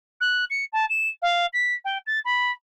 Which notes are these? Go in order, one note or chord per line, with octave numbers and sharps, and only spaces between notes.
F#6
C#7
A5
E7
F5
B6
G5
A6
B5